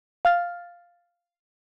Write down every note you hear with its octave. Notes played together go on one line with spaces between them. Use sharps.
F5 F6 A6